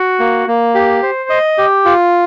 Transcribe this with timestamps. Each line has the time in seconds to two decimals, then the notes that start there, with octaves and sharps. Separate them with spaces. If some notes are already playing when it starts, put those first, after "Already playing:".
Already playing: F#4
0.19 A#3
0.48 A#3
0.75 G4
1.03 C5
1.30 D#5
1.58 G4
1.85 F4